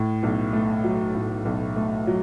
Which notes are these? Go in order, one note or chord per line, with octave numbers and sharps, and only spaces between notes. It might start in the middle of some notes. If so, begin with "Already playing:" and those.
Already playing: A2
B1
A3
F#3
A2
B1
A3
F#3